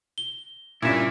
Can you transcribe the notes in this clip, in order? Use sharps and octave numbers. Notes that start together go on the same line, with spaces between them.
G7
G2 A#2 C#3 C#4 E4 E5